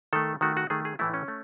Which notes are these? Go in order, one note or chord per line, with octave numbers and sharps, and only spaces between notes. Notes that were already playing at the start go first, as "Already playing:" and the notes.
D#3 A3 A4
D#3 A3 F#4
F#4
D#3 A3 G#4
G#4
A2 E3 A3 E4
C#4
A3